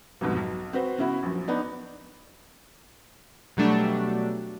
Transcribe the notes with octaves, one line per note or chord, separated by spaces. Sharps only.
C2 F2 G#2 B2
B1
C4 F#4 B4 C5
C#3 B3 E4 F#4
A#1 F#2
B3 D4 D#4
B2 F#3 G3 A3 D4